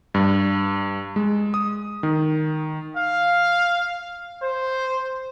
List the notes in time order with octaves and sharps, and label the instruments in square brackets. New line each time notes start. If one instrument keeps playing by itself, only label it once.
[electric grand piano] G2
G#3
D#6
D#3
[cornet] F5
C5